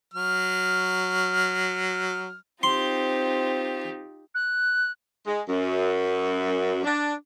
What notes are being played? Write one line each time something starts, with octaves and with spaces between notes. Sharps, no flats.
F#3 F6
C4 D#4 F4 G4 C6
F#6
G#3
F#2
D4